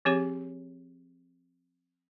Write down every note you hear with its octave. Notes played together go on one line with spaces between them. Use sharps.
F3 C4 G4 G#4 C#5